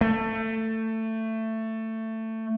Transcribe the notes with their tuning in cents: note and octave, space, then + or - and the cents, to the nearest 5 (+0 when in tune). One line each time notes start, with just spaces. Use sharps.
A3 +20